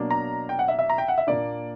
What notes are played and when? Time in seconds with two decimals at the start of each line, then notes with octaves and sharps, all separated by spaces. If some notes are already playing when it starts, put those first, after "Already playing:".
Already playing: B2 F#3 A#3 D4
0.11 A#5
0.49 G5
0.59 F#5
0.68 E5
0.79 E5
0.90 A#5
0.98 G5
1.08 F#5
1.18 E5
1.27 A#2 A#3 D4 D5